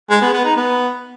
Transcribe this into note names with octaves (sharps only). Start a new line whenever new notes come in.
G#3
B3
B3
D#4
B3